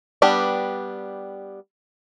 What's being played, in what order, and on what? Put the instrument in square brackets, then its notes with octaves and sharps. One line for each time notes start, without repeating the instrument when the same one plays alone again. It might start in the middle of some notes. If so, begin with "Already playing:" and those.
[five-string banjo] G3 B3 D4 G4